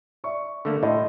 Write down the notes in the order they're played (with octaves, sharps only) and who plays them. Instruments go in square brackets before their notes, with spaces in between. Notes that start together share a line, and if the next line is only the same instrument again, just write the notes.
[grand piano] D5 E5 C#6
[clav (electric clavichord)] D3 A3 A#3
[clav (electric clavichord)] A2 [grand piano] D#5 E5 C6